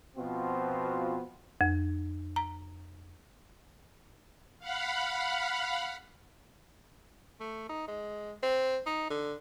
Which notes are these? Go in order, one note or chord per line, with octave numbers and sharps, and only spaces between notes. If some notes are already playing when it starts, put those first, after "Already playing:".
B2 F3 B3 C4 F4 F#4
F2
A#5
F5 F#5 B5
A3
D#4
G#3
C4
D#4
D3